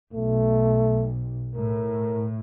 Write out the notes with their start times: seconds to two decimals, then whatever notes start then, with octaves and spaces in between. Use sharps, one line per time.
0.14 B1 A3
1.55 A2 A#4